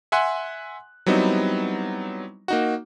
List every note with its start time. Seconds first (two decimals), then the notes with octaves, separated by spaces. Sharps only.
0.12 E5 F#5 G#5 C6 F#6
1.06 F#3 G3 B3 C4 D#4 E4
2.48 A#3 D#4 F#4